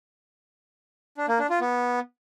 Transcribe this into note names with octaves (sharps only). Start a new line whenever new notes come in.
D4
A#3
D4
F4
B3